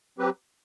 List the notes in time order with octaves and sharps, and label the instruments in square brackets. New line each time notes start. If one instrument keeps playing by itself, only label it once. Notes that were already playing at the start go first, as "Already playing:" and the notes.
[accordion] F#3 C4 G4 B4